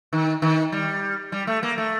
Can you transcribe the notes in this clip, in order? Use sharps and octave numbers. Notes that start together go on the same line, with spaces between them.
D#3
D#3
G3
G3
A3
A#3
A3